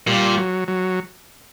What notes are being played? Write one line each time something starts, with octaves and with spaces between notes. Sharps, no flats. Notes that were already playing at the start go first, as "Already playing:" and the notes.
A#2 G3
F#3
F#3